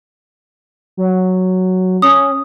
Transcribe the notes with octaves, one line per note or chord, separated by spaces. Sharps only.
F#3
C#4 D#6